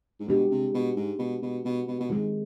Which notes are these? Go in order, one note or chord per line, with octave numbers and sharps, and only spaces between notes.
G#2
B2 G#3 D4 G4
C3
B2
G#2
B2
B2
B2
B2
B2
G#2 D#3 G#3 C4